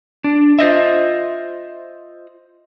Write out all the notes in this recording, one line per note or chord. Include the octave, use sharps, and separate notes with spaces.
D4
F4 C5 D#5 E5